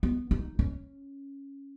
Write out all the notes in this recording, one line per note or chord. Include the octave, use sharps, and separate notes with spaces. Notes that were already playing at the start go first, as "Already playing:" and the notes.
B3
D#4
C#4